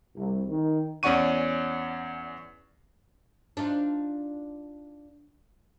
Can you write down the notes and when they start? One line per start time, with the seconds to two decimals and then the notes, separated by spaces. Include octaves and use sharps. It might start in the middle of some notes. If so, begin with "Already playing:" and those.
0.16 C2
0.48 D#3
1.03 E2 C#4 D5 F#5 C#6 D#7
3.57 D4 D#4 F4